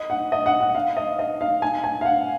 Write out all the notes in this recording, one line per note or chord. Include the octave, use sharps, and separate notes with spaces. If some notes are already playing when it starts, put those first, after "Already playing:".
Already playing: D#5
F#5
D#5
F#5
F#5
F5
D#5
D#5
F5
G#5
G#5
F5
F#5